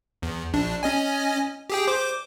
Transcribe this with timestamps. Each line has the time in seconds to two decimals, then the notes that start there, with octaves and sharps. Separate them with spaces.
0.22 E2
0.53 A#1 D4
0.83 C#4 D#5 G#5
1.70 G4 G#4 G5
1.87 C5 D6